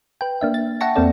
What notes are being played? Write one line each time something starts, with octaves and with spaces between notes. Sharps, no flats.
B4 G5
A#3 D4 E5
A6
E5 F#5 G5 A5 C#6 A#6
E2 A#3 C4 A4 D5